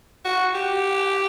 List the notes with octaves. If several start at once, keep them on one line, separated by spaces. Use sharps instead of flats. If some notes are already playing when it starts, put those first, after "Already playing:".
F#4
G4